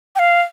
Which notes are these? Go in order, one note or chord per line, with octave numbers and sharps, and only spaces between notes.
G5
F5